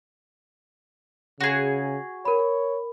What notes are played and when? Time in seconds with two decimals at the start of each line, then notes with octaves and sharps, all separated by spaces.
1.41 C#3 F#4 G#4
2.25 A#4 C#5 B5